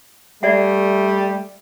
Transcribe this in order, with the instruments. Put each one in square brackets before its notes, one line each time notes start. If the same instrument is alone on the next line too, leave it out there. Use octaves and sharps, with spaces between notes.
[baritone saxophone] G3 [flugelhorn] A3 [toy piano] D5 E5 F#5